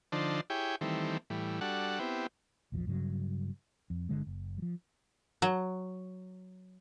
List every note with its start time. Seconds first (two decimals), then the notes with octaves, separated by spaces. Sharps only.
0.12 D3 F3 D4 D#4 C5 A5
0.50 E4 G4 G#4 C#5 G5
0.81 D#3 E3 G3 A3 C4
1.30 A2 E3 G3
1.61 G3 D4 F#4 A4 F#5
1.99 B3 C4 E4 G4
2.72 A#1 E2 E3 F3
2.87 G2 C#3 F#3
3.90 F2
4.09 G1 D3 G#3
4.27 F#1
4.58 F3 F#3
5.42 F#3